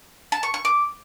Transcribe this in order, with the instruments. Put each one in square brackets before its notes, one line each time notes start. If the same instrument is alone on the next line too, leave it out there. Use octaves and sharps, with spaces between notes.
[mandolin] A5
C#6
C#6
D6